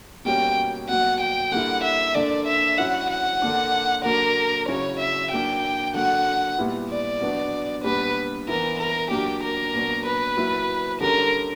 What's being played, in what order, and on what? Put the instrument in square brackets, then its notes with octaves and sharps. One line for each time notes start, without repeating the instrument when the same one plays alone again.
[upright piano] B2 G3 A#3 C#4 [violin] G5
[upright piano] B2 F#3 A#3 [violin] F#5
[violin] G5
[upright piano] D3 G3 A#3 E4 [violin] F#5
[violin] E5
[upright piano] D3 A#3 D4 [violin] D5
[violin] E5
[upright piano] F#3 C#4 E4 [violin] F#5
[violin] F#5
[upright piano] D3 A#3 D4
[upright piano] D3 F#3 A#3 D4 [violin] A#4
[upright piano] C#3 F#3 C#4 E4 [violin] C#5
[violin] E5
[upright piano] F#3 A#3 D4 [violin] G5
[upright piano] D3 F#3 A#3 [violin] F#5
[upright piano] A#2 G3 B3 E4
[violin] D5
[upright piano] B2 F#3 B3 D4
[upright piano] A#2 G3 B3 D4 [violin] B4
[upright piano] E3 B3 E4 [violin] A#4
[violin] A#4
[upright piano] F#3 A#3 D4 [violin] G4
[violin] A#4
[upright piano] A#2 F#3 B3 D4
[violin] B4
[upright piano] F#3 A#3 E4
[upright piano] D3 G3 C#4 [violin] A#4